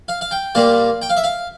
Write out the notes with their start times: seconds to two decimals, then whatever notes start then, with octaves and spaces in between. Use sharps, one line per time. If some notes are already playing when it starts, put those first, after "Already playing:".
0.08 F5
0.21 F5
0.31 G5
0.55 A#2 G3 A#3 F5
1.02 G5
1.10 F5
1.17 E5
1.24 F5